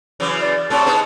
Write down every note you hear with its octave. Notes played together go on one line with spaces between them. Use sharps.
C#3 E3 F#3
D5
A2 C3 A3 A5
B3 D#4 G#4